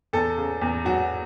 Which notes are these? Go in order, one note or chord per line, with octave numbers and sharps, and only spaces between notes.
E2 A4
C#3
E2
F#3 F#4